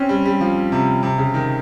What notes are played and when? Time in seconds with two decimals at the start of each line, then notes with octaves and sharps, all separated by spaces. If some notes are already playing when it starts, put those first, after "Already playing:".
Already playing: C4 C#4
0.09 G3
0.26 G3
0.41 F3
0.72 C3
1.03 C3
1.18 C#3
1.34 D#3